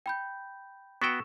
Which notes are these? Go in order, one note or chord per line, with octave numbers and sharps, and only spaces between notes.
G5 B5 G6
B3 F#4 G5 C#6 E6 E7